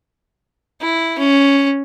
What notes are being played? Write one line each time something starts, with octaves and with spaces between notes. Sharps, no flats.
E4
C#4